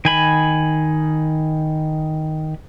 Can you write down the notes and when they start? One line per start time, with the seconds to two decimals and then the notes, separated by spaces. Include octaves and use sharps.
0.05 D#3 G#5 B5